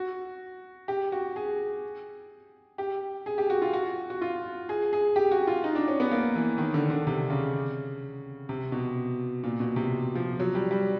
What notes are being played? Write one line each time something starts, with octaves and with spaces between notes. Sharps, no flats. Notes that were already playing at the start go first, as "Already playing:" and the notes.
Already playing: F#4
G4
F#4
G#4
G4
G#4
G4
F#4
F4
F#4
F#4
F4
G#4
G#4
G4
F#4
F4
D#4
D4
C#4
B3
A#3
E3
D#3
D3
D3
C3
C#3
C3
B2
A#2
B2
C3
F3
F#3
G3
G3